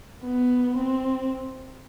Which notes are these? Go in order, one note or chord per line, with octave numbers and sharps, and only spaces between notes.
B3
C4